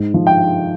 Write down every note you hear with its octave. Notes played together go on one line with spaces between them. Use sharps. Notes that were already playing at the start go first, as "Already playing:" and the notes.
Already playing: G#2
F3
G5